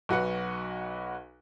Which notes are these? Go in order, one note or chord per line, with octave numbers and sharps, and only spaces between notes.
B1 F#4 B4 F#5